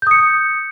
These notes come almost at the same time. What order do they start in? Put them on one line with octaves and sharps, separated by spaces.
G6 D#6 C#7